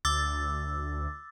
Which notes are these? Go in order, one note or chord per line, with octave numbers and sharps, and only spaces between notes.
D2 D6 E6 A6